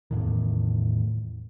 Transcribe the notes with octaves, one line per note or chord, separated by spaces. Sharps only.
E2 A2 D#3